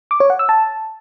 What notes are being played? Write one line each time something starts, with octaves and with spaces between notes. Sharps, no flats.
D6
C#5
F#5
E6
A5